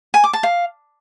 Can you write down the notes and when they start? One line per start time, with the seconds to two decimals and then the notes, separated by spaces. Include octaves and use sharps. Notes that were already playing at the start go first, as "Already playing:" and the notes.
0.14 G#5
0.24 D6
0.33 A5
0.43 F5